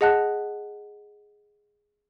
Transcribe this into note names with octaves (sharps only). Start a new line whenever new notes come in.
G#4 D#5 F#5 A5 F#6